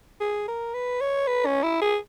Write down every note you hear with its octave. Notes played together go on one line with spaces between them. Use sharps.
G#4
A#4
B4
C#5
B4
C#4
E4
G#4